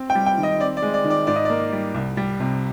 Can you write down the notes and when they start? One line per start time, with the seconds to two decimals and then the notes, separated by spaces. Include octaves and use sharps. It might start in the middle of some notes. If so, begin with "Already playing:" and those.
Already playing: C4
0.10 G5
0.15 G3
0.26 G5
0.38 D#3
0.43 D#5
0.60 C4 D5
0.77 D5
0.82 G#3
0.94 D5
1.04 D#3
1.10 D5
1.27 G#2 D5
1.36 D#5
1.45 A#3 D5
1.72 G3
1.94 C2
2.17 G3
2.40 C3